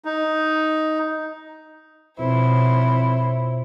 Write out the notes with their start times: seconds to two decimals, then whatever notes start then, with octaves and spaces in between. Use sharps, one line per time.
0.05 D#4
2.19 F2 B2 E4 C5 C#5